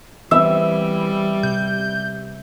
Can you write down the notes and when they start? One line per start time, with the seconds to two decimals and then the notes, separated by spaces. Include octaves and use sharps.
0.31 E3 G3 B3 C4 E5
1.43 C3 G6